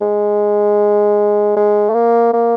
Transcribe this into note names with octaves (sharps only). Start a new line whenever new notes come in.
G#3
G#3
A3
A#3
A#3